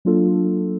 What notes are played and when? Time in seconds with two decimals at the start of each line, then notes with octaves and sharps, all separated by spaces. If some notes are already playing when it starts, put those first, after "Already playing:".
0.05 F#3 A#3 D4 F4 A4